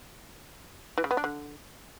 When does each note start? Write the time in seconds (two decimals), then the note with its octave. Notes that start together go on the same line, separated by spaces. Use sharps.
0.98 E3
1.04 C#3
1.11 B3
1.17 D4
1.24 D3